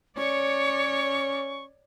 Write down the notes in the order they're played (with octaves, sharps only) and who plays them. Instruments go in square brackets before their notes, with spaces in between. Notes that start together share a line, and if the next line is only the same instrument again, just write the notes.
[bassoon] C#4 [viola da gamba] C#5 D5 [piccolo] C#6